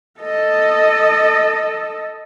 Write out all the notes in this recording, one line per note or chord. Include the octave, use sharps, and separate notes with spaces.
A4 D#5